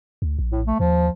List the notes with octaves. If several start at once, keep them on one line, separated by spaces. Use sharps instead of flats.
D2
A#1
A2
A3
D#2 F3